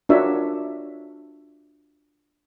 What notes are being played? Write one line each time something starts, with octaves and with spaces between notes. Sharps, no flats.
D4 F4 F#4 A#4 C#5 E5